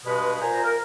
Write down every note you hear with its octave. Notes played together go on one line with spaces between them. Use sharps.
G2 B2 G#3 B4
A#2 C5 G#5 A#5
A#4